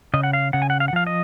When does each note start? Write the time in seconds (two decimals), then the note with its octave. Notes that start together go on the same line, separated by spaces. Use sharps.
0.14 C#3 D#5
0.23 F#5
0.33 F5
0.53 C#3 F#5
0.62 G#5
0.70 F#5
0.80 F5
0.88 F#5
0.93 F3 F5
1.07 D#5